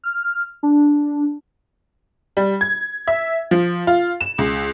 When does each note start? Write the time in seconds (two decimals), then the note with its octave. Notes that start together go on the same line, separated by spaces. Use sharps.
0.04 F6
0.63 D4
2.37 G3
2.61 G#6
3.07 E5
3.51 F3
3.87 F4
4.21 E7
4.38 C#2